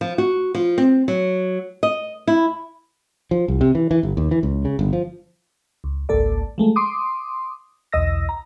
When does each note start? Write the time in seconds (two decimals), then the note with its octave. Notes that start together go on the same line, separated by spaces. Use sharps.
0.01 F3
0.18 F#4
0.54 F3
0.78 C4
1.08 F#3
1.83 D#5
2.27 E4
3.31 F3
3.48 C2
3.61 C3
3.75 E3
3.91 E3
4.03 G1
4.17 D#2
4.31 E3
4.43 C#2
4.65 C#3
4.79 G1
4.93 F3
5.84 C#2
6.09 G#1 C#2 A#3 A4 D5
6.58 F3 G#3 A3
6.76 C6 D6 D#6
7.92 B1 E2 D#5 E6 A#6
8.29 A#5